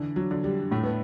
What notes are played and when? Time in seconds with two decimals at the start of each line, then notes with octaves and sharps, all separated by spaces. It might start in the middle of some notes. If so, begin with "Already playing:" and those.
Already playing: D3 E3
0.16 F#3
0.31 D3
0.44 G3
0.71 A2 A3
0.83 B3